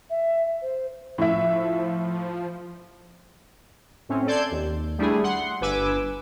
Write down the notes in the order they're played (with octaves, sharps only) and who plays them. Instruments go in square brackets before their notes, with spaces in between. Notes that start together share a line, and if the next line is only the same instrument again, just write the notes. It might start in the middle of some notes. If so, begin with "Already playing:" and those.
[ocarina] E5
C5
[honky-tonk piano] A2 E5 [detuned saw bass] F3
[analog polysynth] A2 C4 C#4
A4 D5 A5 C6 G6 G#6
D#2
G3 A3 D4 E4 G#4
F#5 C6
G1 B4 G#5 D6 E6